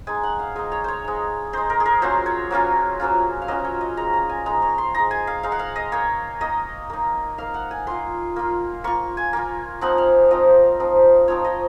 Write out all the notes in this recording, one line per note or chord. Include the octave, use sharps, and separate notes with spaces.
G#3 D#4 G#5
F#5
F5
G#3 D#4 D#5
C#5
C5 C#5
G#3 D#4
G#3 D#4 C5
A#4
G#4
A#4
F#3 A#3 C#4 F4 C5
C#5
F#3 A#3 C#4 F4
F#3 A#3 C#4 F4
F5
F#3 A#3 C#4 F4 D#5
C#5
D#5
G#3 D#4 A#5
A#5
G#5
G#3 D#4 A#5
C#6
C6
G#3 D#4 A#5
G#5
F5
G#3 D#4 F5
F#5
F5
D#5
A#3 D#4 C#5
A#3 D#4 D#5
A#3 D#4
A#3 D#4 F5
F#5
G#5
A#3 F4 C6
A#3 F4
A#3 F4 C#6
G#5
A#3 F4
F3 C4 D#4 F#5
F5
F3 C4 D#4 D#5
F3 C4 D#4
F3 C4 D#4 C#5
D#5